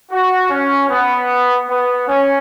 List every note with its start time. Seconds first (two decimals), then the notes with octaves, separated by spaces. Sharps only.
0.11 F#4
0.51 C#4
0.89 B3
1.69 B3
2.08 C#4